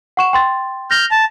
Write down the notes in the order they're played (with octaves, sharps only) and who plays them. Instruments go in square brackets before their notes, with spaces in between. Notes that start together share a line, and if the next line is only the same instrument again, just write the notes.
[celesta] F#5 C#6 E7
G5 C6 A6
[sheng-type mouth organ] F6 G6 [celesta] A#6 F7
[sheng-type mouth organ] A5